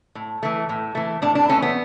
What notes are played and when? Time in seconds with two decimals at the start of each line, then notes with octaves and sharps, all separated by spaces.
0.15 A2
0.43 E3 A3
0.69 A2
0.95 E3 A3
1.22 A2 D4
1.35 D4
1.48 E3 A3 C#4
1.62 B3